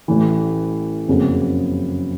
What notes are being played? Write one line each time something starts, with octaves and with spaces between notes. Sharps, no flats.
A1 A2 E3
F#1 F2 C#3 F#3 A#3